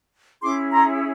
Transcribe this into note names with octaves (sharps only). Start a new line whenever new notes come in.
C#4 E4 G#4 C6 D6
A#5 C6